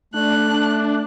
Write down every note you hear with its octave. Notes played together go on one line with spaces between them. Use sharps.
A3 D4 F#6